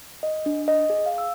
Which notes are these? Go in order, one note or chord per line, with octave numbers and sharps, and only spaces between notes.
D#5
D4
D#5
G#4
F5
E6